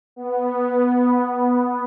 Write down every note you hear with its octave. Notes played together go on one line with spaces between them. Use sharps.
B3